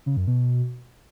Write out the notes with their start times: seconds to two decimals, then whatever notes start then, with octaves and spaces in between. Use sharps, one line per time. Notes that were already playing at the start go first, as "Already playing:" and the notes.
0.06 C#3
0.17 F#2
0.27 B2